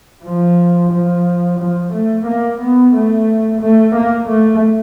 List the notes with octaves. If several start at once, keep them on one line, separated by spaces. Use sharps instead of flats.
F3
F3
F3
A3
A#3
B3
A3
A3
A#3
A3